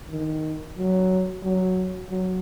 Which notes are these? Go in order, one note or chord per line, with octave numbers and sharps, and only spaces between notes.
D#3
F#3
F#3
F#3